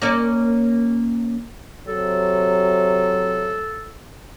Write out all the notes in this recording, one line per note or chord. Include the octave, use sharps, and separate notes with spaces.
A#3 C#4 D5
C3 F#3 A4